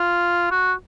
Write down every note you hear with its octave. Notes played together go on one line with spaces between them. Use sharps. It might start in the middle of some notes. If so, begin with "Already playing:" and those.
Already playing: F4
F#4